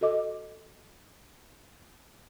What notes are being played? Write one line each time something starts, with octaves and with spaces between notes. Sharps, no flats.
F#4 A4 D#5 D6